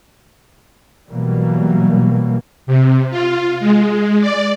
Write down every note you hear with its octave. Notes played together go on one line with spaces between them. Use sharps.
B2 E3 F#3 G3 A#3
C3
F4
G#3
D5